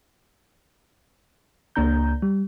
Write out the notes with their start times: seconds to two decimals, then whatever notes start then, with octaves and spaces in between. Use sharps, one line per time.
1.76 C#2 A#3 D4 A#5 G6
2.22 G3